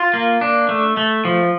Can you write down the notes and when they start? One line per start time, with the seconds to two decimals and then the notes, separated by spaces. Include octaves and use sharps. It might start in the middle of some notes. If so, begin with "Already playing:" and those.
Already playing: F4
0.13 A#3
0.41 D4
0.69 A3
0.97 A3
1.25 F3